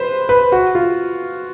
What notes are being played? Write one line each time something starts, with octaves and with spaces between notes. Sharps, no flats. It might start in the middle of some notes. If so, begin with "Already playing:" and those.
Already playing: B4 C5
B4
F#4
F4